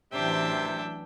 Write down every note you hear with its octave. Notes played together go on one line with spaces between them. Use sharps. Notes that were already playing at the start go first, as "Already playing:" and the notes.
A1 C3 E3 F#3 D4 E5 G5